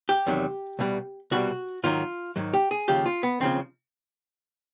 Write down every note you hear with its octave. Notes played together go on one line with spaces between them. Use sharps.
G4
E2 C3 D#3 F#3
C2 B2 G3
C2 B2 G3 F#4
G#2 D#3 F#3 F4
G#2 D#3 F#3
G4
G#4
D#2 C#3 F3 G4
F4
B3
D#2 C#3 F3 C4